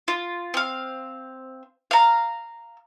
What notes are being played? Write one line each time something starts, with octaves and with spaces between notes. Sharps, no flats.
F4
C4 F5
F5 A#5